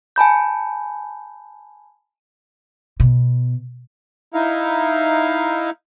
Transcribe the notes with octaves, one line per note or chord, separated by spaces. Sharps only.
G#5 A5 B5 G6
B2
D#4 E4 F5